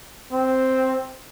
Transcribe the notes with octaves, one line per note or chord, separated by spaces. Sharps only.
C4